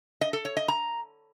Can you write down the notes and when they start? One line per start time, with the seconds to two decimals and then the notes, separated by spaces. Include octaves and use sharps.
0.21 D#5
0.33 A4
0.45 C#5
0.57 D#5
0.68 A#5